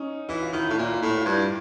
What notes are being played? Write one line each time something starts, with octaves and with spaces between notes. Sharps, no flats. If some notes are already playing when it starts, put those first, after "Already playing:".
Already playing: C#4 D#4
E3 E4
F4
D#3 E4
A2 F4
A#2 E4
F4
A2 E4
F4
G2 D4 E4